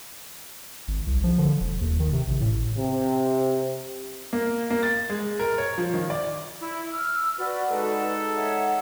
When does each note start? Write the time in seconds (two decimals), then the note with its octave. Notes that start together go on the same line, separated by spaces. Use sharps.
0.88 G#1
1.07 C2
1.24 F3
1.38 D3
1.61 E1
1.81 D#2
2.00 D#3
2.13 C3
2.28 A1
2.41 A2
2.78 C3
4.33 A#3
4.71 A#3
4.83 A6
5.10 G#3
5.39 A#4
5.58 C#5
5.78 F3
5.94 D#3
6.10 D5
6.60 E4
6.91 E6 F6
7.38 F#4 B4 D5
7.71 G#3 D#4 A4
8.36 C#5 E5 F#5